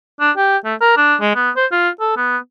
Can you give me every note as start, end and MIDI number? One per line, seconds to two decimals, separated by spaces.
0.21 0.31 62
0.37 0.57 67
0.65 0.75 57
0.81 0.93 70
0.97 1.16 62
1.21 1.32 56
1.35 1.50 59
1.56 1.66 72
1.72 1.89 65
2.00 2.17 69
2.17 2.37 59